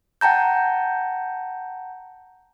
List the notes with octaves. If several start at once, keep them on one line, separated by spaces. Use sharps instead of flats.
F#5 G5 A5 A#5 G6